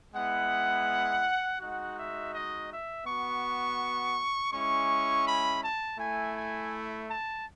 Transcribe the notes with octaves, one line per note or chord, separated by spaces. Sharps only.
G#3 B3 E4 F#5
G#3 D#4 F#4 F#5
E5
D#5
E5
B3 F#4 C#6
G#3 C#4 E4 C#6
B5
A5
A3 E4 G#5
G#5
A5